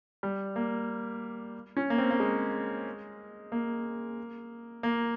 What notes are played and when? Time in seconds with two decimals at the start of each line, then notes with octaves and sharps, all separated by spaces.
0.23 G3
0.56 A#3
1.77 C#4
1.90 A#3
1.98 C4
2.11 A#3
2.20 G#3
3.52 A#3
4.83 A#3